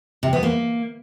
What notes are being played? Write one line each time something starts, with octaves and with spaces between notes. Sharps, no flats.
C3
B3
A#3